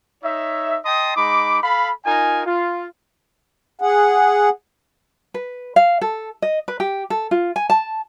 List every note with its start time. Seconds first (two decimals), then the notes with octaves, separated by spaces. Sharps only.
0.24 D#4 C#5 E5
0.85 D#5 G5 A5 C6 D#6
1.16 G#3 D#4 B5 D6
1.62 A4 F5 B5
2.05 D#4 F4 A#4 G#5
2.45 F4
3.81 G#4 F#5
5.34 B4
5.76 F5
6.01 A4
6.42 D#5
6.68 B4
6.80 G4
7.10 A4
7.31 F4
7.56 G#5
7.70 A5